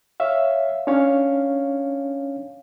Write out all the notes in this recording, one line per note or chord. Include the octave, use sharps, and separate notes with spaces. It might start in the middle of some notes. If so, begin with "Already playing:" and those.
C#5 E5 F5
C#4 D4 C#5 F5